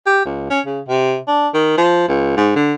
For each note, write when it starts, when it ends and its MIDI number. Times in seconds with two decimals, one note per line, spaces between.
0.06 0.22 67
0.26 0.50 37
0.50 0.60 61
0.67 0.80 49
0.88 1.18 48
1.28 1.48 62
1.54 1.77 51
1.78 2.07 53
2.09 2.34 37
2.37 2.54 44
2.56 2.74 50